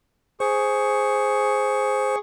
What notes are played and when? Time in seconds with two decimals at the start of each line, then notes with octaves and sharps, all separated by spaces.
0.40 G#4 C5 C#6